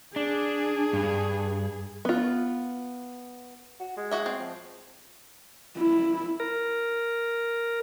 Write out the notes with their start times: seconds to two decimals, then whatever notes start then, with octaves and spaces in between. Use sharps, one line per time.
0.16 D4 G#4
0.93 G2
2.05 B3 F4
3.80 F#4
3.97 G#3
4.11 F#4 D#5 E5
4.26 C4
4.40 F3
5.77 E4
6.40 A#4